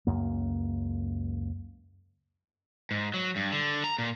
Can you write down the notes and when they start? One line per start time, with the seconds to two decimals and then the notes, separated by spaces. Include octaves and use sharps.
0.07 C#2 F#2 A#3
2.91 G#2
3.14 F#3
3.36 G2
3.52 D3
3.84 A#5
3.98 A#2